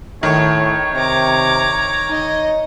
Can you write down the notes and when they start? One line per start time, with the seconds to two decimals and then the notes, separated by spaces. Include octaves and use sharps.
0.23 A2 D#3 C#5 C#6
0.95 C3 A#5 D6
2.11 D#4 D#5